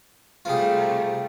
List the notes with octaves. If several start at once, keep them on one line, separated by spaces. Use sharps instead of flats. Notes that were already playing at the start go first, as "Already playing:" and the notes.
C3 G3 A3 F4 G#4